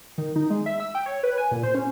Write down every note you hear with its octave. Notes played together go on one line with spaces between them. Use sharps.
D#3
D#4
G#3
E5
E6
G5
C#5
B4
G#5
A#2
C5
C#4